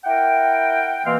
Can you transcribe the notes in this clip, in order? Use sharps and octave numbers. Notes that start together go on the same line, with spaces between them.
E4 A#4 F#5 G5
B2 E3 A#3 C4 F5 C6